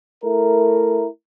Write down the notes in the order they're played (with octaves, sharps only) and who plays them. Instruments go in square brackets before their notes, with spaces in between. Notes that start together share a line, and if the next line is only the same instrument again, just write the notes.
[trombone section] A3 E4 A#4